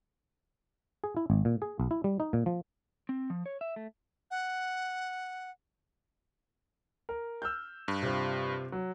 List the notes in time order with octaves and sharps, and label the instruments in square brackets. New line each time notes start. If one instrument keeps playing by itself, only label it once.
[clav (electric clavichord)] G#4
E4
G#1
A#2
G#4
B1
E4
G3
D#4
A#2
F3
[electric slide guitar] C4
F3
C#5
E5
A3
[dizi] F#5
[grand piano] A#4
E6 F6 G6
[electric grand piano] G2
[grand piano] C3 F4 C5
F#3